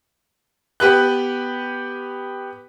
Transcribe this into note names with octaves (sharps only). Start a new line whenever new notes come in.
B3 G4 B4 F#6